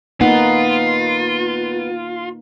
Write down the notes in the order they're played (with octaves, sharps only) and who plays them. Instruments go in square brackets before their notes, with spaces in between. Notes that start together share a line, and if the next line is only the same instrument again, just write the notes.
[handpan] A#3 D#4 [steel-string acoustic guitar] B3 [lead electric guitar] F4 [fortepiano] F#5